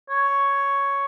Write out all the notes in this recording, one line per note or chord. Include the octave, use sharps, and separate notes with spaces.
C#5